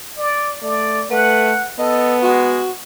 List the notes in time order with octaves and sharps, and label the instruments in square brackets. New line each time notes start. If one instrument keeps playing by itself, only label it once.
[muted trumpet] D5
[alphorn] A3 [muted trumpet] D5
[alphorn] A3 [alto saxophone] B4 [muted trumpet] F#5
[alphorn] B3 [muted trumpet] A4 [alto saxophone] D#5
[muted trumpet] G#3 [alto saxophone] F#4